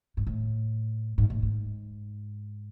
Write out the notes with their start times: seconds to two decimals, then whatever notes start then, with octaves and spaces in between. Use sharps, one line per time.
0.17 G#2
0.27 A2
1.18 G#2
1.30 A2
1.43 G#2